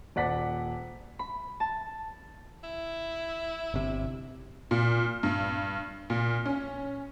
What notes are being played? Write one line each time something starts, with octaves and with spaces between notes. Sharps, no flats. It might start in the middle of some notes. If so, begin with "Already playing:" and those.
D#1 D5 F#5 B6
B5
A5
E4
G1 C3
A#2
G2
A#2
C#4